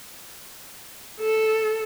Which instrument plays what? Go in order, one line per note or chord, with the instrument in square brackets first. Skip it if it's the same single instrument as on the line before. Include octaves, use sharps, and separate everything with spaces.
[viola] A4